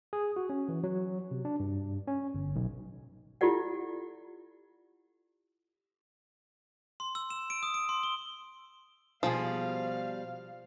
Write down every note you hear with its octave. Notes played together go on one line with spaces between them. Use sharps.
G#4
F#4
C#4
E3
F#3
C3
D4
G2
C#4
G1
B1
E4 F4 G4 A4 D5 F#5
C6
E6
E7
D7
D#6
D7
C6
G7
B2 F3 G3 G#4 F5